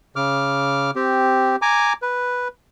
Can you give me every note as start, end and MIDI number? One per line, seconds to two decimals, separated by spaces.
0.16 0.91 49
0.16 0.91 86
0.16 0.91 89
0.96 1.56 60
0.96 1.56 67
1.62 1.93 80
1.62 1.93 82
1.62 1.93 86
2.02 2.48 71